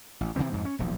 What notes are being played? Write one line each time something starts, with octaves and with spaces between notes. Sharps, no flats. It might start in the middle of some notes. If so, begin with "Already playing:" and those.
A1
C3 D#3 E3 C4
F2 G#2
C#4
D#1 B1 F3